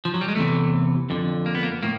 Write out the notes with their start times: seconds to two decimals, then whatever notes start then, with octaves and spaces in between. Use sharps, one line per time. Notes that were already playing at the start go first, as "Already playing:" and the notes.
0.05 F3
0.14 F#3
0.21 G3
0.28 G#3
0.35 E2 C3 E3 A3
1.10 F2 D3
1.46 A#3
1.55 B3
1.63 A#3
1.83 A2 A#3